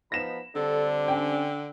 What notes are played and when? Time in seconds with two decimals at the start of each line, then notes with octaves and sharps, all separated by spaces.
0.12 F3 B3 D#4 B5 A#6 E7
0.55 D3 G3 C4 D4 A4
1.08 C#4 G5